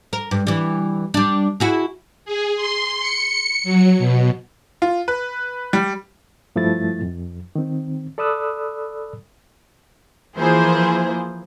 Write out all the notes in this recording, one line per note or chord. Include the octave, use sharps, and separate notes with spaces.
A#4
G2
E3 G3
G3 D4
E4 F#4 G#4
G#4
C6
C#7
F#3
B2
F4
B4
G3
G2 F3 A3 E4 A6
F2
D#3 C4
A4 D5 B5 D#6 E6 F#6
E3 F3 A#3 E4 G#4 C5